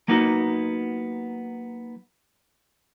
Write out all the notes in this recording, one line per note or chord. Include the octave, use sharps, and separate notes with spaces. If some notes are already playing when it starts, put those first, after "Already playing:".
F#3 A#3 B3 D#4 F#4